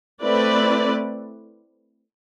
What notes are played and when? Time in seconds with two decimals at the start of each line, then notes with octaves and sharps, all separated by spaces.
0.22 A3 C4 E4 B4 D5